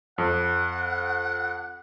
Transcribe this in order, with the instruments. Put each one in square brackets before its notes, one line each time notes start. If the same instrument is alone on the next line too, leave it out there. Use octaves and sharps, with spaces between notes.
[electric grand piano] F2 [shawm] F#5